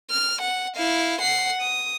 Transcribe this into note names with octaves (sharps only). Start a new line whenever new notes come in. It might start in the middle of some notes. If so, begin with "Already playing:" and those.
F6
F#5
E4 F5
F#5 C7
D#6